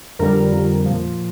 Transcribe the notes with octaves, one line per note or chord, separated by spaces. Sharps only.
F2 D3 G3 A#4
F2 D3 G3
A#2 F3